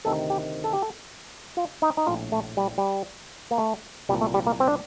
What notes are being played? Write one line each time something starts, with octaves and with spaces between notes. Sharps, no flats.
D2 C3 D#3 A4
G4
A4
G4
A4
F4
D#4
D#4
A#1 A2 F4
A3
G3
G3
A#3
A3
C2 A#2 G3
A3
G3
A#3
C4
D4